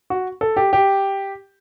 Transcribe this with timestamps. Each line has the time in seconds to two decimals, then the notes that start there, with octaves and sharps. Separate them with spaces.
0.10 F#4
0.41 A4
0.57 G4
0.73 G4